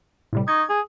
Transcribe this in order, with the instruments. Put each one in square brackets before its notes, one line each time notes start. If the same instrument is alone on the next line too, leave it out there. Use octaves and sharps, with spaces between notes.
[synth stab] A2 C3 G3
[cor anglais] D#4 [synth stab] C#6 G#6
[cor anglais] G#4